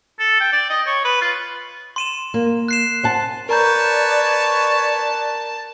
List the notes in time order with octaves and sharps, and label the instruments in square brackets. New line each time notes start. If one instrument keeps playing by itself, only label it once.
[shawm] A4
G5
D5
D#5
C#5
B4
F4
[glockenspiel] C6 D#7 E7
[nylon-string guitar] A#3
[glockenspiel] F#6 C7 E7
[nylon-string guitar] C5 F#5 A5
[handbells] A#4 A#5 G6 [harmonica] B4 C#5 [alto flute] D5 [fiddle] A5